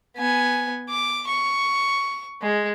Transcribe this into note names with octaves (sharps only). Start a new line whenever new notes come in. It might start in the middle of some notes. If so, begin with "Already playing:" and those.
B3 G#5
D6
C#6
G#3